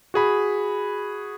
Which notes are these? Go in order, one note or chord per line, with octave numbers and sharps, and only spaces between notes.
F#4 G#4 B5